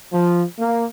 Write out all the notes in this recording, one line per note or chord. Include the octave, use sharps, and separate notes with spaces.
F3
A#3